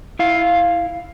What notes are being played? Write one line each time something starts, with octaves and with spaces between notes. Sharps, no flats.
E4 F5